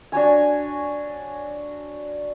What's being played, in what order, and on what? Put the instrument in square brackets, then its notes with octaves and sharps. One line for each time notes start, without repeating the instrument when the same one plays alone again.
[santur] D4 F#4 C#5 G#5